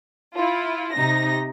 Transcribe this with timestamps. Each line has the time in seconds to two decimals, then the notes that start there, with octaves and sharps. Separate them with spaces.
0.35 E4 F4
0.93 C3 D#4 A#6